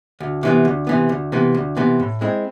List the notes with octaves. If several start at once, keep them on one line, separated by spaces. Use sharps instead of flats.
D2
C3 E3 B3
D2
C3 E3 B3
D2
C3 E3 B3
D2
C3 E3 B3
A2
G#3 C4 E4